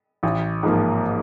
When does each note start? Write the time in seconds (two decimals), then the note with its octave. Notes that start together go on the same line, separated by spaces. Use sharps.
0.23 A1
0.63 G#2 F3 A#3